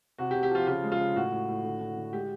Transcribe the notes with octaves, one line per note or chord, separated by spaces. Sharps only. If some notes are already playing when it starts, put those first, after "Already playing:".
C3 F#4
G4
C3
G4
F3 F4
C#3 F4
G#3
F4
C#3
A2 F#4
A2
A2
D3
D3
D3
G#3 G4